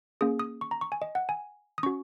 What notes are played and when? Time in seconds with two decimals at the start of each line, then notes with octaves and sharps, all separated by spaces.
0.21 A#3 C#4 G#4 D#6
0.39 D#6
0.61 C#6
0.71 A#5
0.81 C#6
0.92 G#5
1.02 D#5
1.15 F#5
1.29 G#5
1.78 D#6
1.83 C#4 F#4 C#6